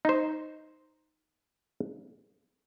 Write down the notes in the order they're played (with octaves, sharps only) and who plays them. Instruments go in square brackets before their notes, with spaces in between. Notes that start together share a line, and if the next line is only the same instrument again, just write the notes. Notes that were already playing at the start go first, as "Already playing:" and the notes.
[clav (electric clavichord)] D#4 C5